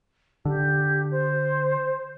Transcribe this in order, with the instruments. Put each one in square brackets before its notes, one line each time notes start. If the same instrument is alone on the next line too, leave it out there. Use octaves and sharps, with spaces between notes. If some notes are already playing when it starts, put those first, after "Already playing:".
[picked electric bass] D3 [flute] G4
[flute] C5